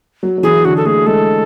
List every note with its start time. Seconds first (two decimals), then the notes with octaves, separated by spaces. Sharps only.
0.23 F#3
0.38 F#3
0.43 E3 G#4
0.65 D3 F#4
0.76 A4
0.85 A3 G#4
1.06 G#3 A4